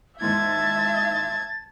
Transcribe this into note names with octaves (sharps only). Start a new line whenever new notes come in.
D#2 G#2 E3 E5 A5 G#6 A6